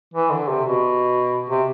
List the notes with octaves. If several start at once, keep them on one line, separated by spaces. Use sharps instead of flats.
E3
D3
C3
B2
C3